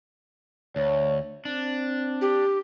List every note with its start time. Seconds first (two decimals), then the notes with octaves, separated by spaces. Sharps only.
0.76 D2 C#5
1.45 C4 D4
2.21 G4